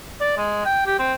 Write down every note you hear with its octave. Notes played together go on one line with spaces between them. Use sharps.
D5
G#3
G5
G4
C4